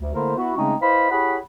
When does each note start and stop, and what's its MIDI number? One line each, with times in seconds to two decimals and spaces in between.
0.01 0.12 38
0.14 0.35 50
0.14 0.35 57
0.14 0.35 58
0.14 0.35 64
0.14 0.35 70
0.14 0.35 72
0.36 0.53 59
0.36 0.53 64
0.36 0.53 66
0.57 0.74 49
0.57 0.74 56
0.57 0.74 57
0.57 0.74 60
0.57 0.74 61
0.57 0.74 63
0.81 1.08 64
0.81 1.08 71
0.81 1.08 72
0.81 1.08 75
0.81 1.08 77
0.81 1.08 83
1.11 1.38 64
1.11 1.38 67
1.11 1.38 68
1.11 1.38 73
1.11 1.38 78
1.11 1.38 83